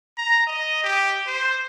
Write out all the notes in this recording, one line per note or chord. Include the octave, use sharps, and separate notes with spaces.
A#5
D#5
G4
C5